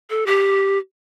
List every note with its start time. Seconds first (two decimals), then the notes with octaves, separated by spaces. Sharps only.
0.10 A4
0.26 G4